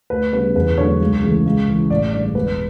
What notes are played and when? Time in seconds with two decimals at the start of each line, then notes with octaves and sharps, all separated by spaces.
0.10 D2 B4
0.33 C#3 G3 B3 B4
0.55 E2 B4
0.77 D3 F#3 A3 C#5
1.00 C#2
1.23 C#3 E3 A3
1.46 C#2
1.68 C#3 E3
1.90 A1 D5
2.13 G2 D3 D5
2.35 E1 B4